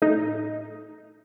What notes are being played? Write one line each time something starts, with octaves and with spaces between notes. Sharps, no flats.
A2 D#4